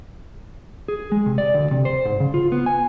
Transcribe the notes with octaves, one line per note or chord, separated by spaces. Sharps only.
G#4
G#3
C3
D5
D2
C3
C5
G#2
C#3
F4
B3
G#5